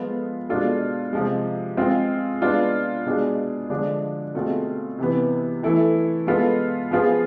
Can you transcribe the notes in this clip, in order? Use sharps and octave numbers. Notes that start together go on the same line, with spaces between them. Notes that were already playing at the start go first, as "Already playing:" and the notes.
Already playing: F3 G#3 B3 F4 A4
B2 G#3 D4 F4 A4
C3 F3 G#3
G#3 C4 F4 G#4
G#3 B3 D4 F4
B2 G#3 D4 G#4
D3 F3 G#3 D4
B2 A3 C4 F4 G#4
C3 E3 B3
E3 A3 E4 A4
G#3 B3 F4 A4
F3 B3 F4 G#4